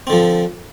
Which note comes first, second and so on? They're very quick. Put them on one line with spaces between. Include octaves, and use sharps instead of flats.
C4 D3 F3